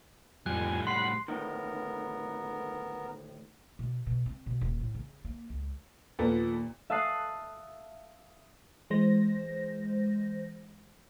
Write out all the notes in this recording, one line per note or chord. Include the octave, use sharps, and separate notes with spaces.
F2 A2 G3 G#5 F#6
F#5 B5 C6 C7
D2 A2 D#3 B3 A#4
B2
B2
C4
B2
D#1
A2
C#3
A#3
C#2
D#2 A#2 F3 B3 A4
E5 F5 A5 D#6 F#6 C7
E3 G#3 C5 A#6